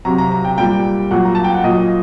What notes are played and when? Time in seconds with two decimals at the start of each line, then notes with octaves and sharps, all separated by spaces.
0.05 C3 F#3 A#5
0.18 A#5
0.32 A#5
0.45 G5
0.58 A#2 G3 G5
1.11 A#2 F#3 F#5
1.25 A#5
1.35 A5
1.44 G5
1.54 F#5
1.64 A#2 F#3 D#5